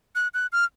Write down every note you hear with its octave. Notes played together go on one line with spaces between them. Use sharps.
F#6
F#6
F6